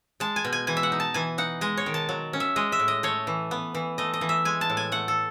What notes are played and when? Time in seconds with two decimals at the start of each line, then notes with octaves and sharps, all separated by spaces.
0.20 G#3 A5
0.36 G#5
0.45 B2
0.53 G#5
0.67 E3 G#5
0.77 E5
0.83 F#5
0.92 D#4
1.00 A5
1.14 E3 G#5
1.38 D#4 F#5
1.61 G#3 D#5
1.77 C#5
1.86 D#3
1.94 A5
2.09 F#3
2.33 C#4
2.40 E5
2.56 G#3 D#5
2.72 E5
2.79 A2
2.88 D#5
3.03 A3 C#5
3.27 E3
3.51 B3
3.75 E3
3.98 A3 D#5
4.14 D#5
4.21 E3
4.29 E5
4.45 G#3 G#5
4.61 A5
4.70 A2
4.77 G#5
4.92 A3 F#5
5.08 A4